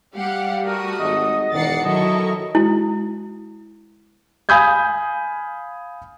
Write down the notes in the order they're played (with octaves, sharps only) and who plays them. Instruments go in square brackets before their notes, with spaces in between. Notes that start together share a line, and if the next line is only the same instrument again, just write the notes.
[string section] G3 [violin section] G4 F5 F#5
[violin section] A3 F#4 D#6 [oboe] A#4
[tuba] G#1 [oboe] D#5
[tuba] E1 [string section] D#3 F#5 C#7 [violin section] D5 A6 C7
[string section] D#3 C#6 [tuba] F#3 [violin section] E4 A4 A#4 [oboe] D#5
[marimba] G#3 F#4 [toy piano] E4
[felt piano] F5 G#5 B5 D#6 G6 G#6